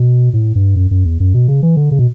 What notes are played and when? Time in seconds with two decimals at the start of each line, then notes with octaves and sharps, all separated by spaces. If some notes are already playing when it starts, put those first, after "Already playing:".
Already playing: B2
0.33 A2
0.55 G2
0.76 F#2
0.91 F#2
1.05 E2
1.20 F#2
1.34 B2
1.48 C#3
1.63 E3
1.77 D3
1.91 C#3
1.99 B2